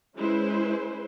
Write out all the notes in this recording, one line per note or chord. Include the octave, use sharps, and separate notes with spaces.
G#3 C#4 E4 B4 C5